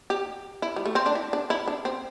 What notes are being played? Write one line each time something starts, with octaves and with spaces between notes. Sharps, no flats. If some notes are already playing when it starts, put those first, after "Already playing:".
G4
E4
G3
A3
C4
D4
E4
D4
E4
D4
C4